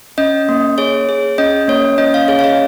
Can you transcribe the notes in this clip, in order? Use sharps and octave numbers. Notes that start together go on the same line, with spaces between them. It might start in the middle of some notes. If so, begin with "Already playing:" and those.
C#4 D#5
A#3
G#4 C#5
G#4
C#4 D#5
A#3 C#5
C#4 D#5
F5
G#4 C#5
F5
D#5